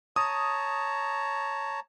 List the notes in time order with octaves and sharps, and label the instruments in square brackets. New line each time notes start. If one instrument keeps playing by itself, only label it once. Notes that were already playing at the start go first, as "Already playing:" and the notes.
[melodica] C#5 A5 A#5 [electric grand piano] D#6